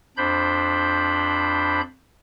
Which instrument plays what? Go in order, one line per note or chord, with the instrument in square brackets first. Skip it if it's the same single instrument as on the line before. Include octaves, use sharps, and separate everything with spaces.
[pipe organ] F2 D4 C5 B5 G6